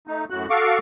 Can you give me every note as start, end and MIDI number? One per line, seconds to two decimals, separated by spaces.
0.07 0.25 57
0.07 0.25 63
0.30 0.46 42
0.30 0.46 45
0.30 0.46 66
0.30 0.46 90
0.50 0.78 66
0.50 0.78 69
0.50 0.78 77
0.50 0.78 85
0.50 0.78 86